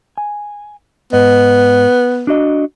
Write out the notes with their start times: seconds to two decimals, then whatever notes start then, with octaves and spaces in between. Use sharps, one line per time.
0.18 G#5
1.13 G#2 B3 D#5
2.27 D4 F#4 D#5